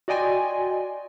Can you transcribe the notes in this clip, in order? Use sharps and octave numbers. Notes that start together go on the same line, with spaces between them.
F#4 D5 D#5 G5 G#5 C6